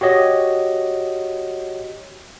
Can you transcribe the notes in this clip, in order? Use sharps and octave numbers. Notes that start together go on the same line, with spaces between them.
F#4 G4 C#5 D#5